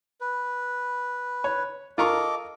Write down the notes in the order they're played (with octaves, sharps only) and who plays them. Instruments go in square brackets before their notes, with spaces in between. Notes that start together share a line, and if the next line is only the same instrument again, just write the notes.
[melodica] B4
[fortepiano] C#5
[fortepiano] F4 A#4 C#6 [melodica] A4 D#5 D6